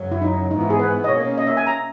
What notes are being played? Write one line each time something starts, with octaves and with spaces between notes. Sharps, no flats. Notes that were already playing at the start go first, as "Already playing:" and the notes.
Already playing: F#2 C#3 F#3
E4
D#4
G#2 E3 B3 D#4
E4
G#4
B4
D#5
B2 A#3 C#4 C#5
D#5
E5
G#5
A#5